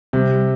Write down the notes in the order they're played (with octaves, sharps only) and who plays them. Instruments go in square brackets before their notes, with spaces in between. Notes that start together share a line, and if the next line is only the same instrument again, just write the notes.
[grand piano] C3 [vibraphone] G3